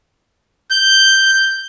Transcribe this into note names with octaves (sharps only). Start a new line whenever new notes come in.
G6